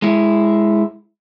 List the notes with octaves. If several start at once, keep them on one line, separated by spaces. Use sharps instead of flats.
G#3 E4